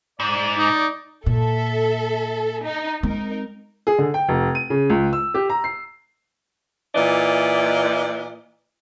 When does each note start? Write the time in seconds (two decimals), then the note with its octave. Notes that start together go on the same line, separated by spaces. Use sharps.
0.20 G#2 D5
0.58 D#4
1.26 A#2 A4 E5
2.64 D#4
3.03 G#3 C4 D#4 A#4
3.87 G#4
3.98 D3
4.14 G5
4.29 F1
4.55 D#7
4.70 C#3
4.90 C#2
5.13 E6
5.34 G4
5.50 A#5
5.64 C7
6.95 A#2 E3 D5 D#5